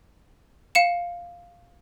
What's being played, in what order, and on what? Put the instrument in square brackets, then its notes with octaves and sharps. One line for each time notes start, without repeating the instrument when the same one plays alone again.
[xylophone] F5 C#7 E7